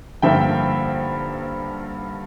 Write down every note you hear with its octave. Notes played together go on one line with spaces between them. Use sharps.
G2 D3 F3 A#3 E5 G5